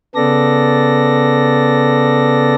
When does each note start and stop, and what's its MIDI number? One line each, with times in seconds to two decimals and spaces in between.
0.15 2.55 49
0.15 2.55 59
0.15 2.55 69
0.15 2.55 74
0.15 2.55 94